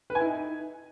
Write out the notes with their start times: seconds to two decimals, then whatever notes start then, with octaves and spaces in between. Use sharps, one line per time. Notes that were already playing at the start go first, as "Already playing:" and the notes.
0.10 B4
0.15 G#5
0.20 E4
0.25 D#4